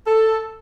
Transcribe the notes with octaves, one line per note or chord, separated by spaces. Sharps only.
A4